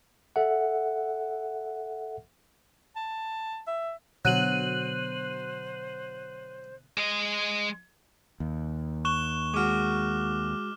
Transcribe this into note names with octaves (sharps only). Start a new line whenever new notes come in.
A4 E5 F#5
A5
E5
B2 D3 F#3 C5 F#6 D#7 F#7
G#3 D#5
D#2
C#6 F#6 E7 G7
G#3 F#4 D6 F6